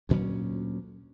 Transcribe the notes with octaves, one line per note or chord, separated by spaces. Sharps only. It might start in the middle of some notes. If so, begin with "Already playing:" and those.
D2 A#2 F#3 C#4